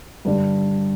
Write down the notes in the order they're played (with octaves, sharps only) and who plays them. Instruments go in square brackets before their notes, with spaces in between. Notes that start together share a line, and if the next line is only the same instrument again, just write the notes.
[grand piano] G2 D3 G3